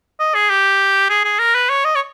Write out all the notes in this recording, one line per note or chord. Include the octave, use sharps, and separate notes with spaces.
D#5
G#4
G4
G#4
G#4
A#4
B4
C#5
D#5
C#5